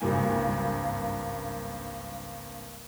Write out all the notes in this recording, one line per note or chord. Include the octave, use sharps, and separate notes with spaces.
G#1 C#2 G2 A#3 G#5